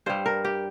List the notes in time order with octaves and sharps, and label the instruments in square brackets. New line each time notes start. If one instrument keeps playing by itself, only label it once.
[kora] G2 G3 C5
A#4
G4